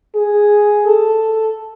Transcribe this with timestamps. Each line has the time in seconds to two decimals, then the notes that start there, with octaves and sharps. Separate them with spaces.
0.15 G#4
0.86 A4